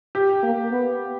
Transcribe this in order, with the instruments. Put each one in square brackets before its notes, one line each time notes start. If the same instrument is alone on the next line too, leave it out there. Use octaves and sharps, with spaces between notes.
[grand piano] G4
[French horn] A#3
B3